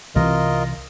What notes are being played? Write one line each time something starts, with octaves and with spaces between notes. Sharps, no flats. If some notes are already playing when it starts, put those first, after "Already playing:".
C2 C3 E3 F4 A#4 D#5